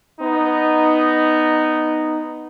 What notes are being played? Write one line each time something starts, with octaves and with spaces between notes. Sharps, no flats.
B3 D#4